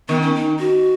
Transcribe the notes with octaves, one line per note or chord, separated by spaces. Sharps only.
D#3 B3
C#4
D#4
F#4